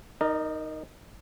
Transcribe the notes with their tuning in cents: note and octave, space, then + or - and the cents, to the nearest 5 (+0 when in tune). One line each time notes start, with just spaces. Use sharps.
D#4 +0 A#4 +0 D5 +45